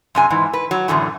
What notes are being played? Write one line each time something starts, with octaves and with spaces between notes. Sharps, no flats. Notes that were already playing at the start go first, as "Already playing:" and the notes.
F#2 C3 G#5
G#2 E3
B4
F#3
F#2 A2 D3 E3